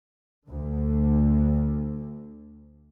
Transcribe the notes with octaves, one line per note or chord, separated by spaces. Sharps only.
D2 D3